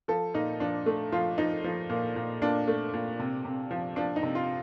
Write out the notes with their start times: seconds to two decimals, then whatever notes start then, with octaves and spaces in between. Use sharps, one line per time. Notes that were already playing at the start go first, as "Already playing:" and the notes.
0.08 F3 A4
0.34 A#2 D#4
0.60 F3 D4
0.86 A3
1.12 F3 F4
1.38 F3 D#4
1.64 F3
1.90 A#2
2.16 A#2
2.41 A#2 D4
2.67 A3
2.94 A#2
3.19 C3
3.45 C3
3.71 F3
3.96 F3 D4
4.16 D#4
4.23 C3
4.35 F4